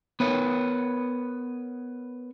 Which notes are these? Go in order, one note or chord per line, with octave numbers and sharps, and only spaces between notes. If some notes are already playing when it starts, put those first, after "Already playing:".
B3 A#4 B4 C#5